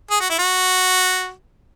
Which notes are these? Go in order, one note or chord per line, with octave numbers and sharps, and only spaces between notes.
G#4
F#4
E4
F#4